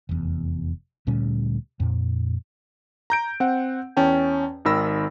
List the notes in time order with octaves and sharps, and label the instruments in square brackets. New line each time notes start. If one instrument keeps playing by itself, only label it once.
[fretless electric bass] F1 E2
D2 A#2 G3 C#4
F2 A#2
[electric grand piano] A#5 G6 D7
C4 F#5
E2 C#4 G5 A5
G#1 D#3 A#4 B5 E6 A#6